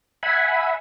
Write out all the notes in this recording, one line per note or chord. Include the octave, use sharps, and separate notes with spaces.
E5 F#5 G#5 B5